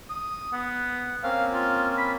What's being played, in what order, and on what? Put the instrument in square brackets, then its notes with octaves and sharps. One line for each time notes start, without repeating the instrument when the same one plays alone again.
[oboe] D#6
[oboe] B3 [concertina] F#5
[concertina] A#3 C4 C#4 [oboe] F5
[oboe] F4
B5